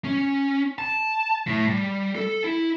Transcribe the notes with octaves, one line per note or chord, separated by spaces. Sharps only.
C#4
A5
A2
G3
A4
E4